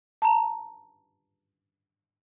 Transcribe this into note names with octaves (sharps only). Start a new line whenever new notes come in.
A5 A#5